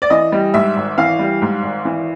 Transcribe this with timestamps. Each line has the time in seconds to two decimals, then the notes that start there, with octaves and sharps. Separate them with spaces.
0.02 D5
0.10 E3 D#5
0.32 G3
0.54 G#2 E5
0.76 G#1
0.98 E3 F5
1.19 G3
1.42 G#2
1.63 G#1
1.85 E3